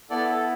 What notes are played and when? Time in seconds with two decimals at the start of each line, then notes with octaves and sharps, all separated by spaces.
0.10 B3 E4 A4 D5
0.29 A4